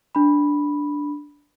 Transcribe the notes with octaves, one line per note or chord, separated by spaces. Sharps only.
D4 B5